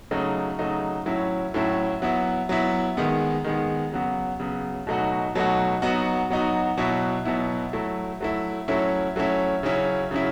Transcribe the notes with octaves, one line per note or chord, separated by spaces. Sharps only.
C#3 F#3 A3 D#4
C#3 F#3 A3 D#4
A2 F#3 C#4 E4
A2 F#3 C#4 E4
F#3 B3 E4
F#3 B3 E4
D#3 G#3 B3
D#3 G#3 B3
C#3 F#3 B3
C#3 F#3 B3
B2 F#3 A3 D#4 F#4
B2 F#3 A3 D#4 F#4
F#3 B3 D#4 F#4
F#3 B3 D#4 F#4
B2 F#3 B3 E4
B2 F#3 B3 E4
F#3 A3 E4
F#3 A3 E4
F#3 A3 C#4 E4
F#3 A3 C#4 E4
C#3 F#3 C#4 E4
C#3 F#3 C#4 E4